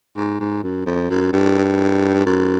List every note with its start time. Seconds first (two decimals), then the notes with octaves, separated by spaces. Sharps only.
0.17 G#2
0.40 G#2
0.63 F#2
0.86 F2
1.10 F#2
1.32 G2
2.26 F#2